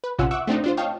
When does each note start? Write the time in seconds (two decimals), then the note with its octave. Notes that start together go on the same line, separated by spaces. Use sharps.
0.04 B4
0.19 A#1 C3 C#4 F4 F#5 E6
0.31 E5 F#5 C#6 D6 E6
0.47 A3 C4 D4 D#4
0.64 D4 F4 C5
0.77 C#5 D#5 F5 G5 A5